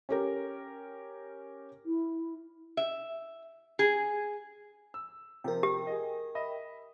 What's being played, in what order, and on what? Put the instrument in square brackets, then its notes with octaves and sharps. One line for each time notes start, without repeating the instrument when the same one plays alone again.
[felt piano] C#4 G4 A#4
[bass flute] E4
[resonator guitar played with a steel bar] E5
G#4
[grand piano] E6
[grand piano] C3 F3 [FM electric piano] A#4 G5
[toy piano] G4
[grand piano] G#4 D#5
D#5 E5 B5